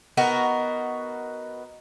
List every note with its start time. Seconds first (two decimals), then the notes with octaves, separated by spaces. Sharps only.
0.17 B3 D#4 F#4 A#4